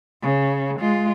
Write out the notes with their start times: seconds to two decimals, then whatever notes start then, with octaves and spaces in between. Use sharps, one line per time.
0.22 C#3
0.80 G#3 F4